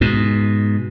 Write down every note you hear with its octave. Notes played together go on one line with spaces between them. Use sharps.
G#2 B2